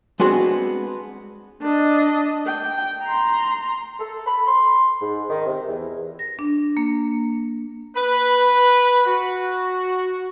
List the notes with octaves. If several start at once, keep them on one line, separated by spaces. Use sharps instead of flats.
G#3 B3 C4 D4 F#4 G#4
D4 D#5
G5
A#5 C6
A4
B5
C6
G#2
D#3
C3
E2
A#6
D4
A#3
B4
F#4